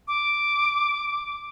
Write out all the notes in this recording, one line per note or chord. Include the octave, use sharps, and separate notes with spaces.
D6